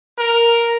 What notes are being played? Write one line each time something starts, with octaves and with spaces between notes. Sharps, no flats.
A#4